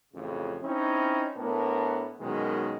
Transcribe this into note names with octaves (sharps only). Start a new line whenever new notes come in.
A1 F2 C#3
C4 C#4 D#4 E4
A2 B3 D4 A#4
F#2 B2 D#3 G#3